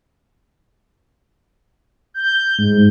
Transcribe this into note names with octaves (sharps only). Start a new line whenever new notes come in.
G6
G#2